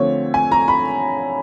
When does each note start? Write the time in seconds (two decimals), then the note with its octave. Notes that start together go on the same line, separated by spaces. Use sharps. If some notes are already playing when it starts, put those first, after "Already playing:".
Already playing: D3 F3 A3 C4 C#5
0.34 G#5
0.52 A#5
0.68 B5